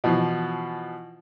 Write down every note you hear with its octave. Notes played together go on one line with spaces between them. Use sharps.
B2 E3 F3